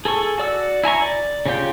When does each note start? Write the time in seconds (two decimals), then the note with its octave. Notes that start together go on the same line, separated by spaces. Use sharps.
0.05 G#4 A4 G#5 C#6
0.38 F#4 D5 E6
0.84 E4 G#5 A#5 C#6
1.02 D5
1.46 C#3 C#4 F4 G4 G5